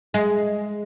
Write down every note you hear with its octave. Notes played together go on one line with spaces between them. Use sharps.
G#3